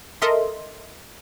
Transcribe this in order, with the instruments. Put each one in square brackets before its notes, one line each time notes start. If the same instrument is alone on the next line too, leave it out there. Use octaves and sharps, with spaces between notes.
[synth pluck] A4 A#4 D#5 E5 C6